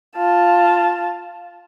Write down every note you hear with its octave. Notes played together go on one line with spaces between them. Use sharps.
F4 A5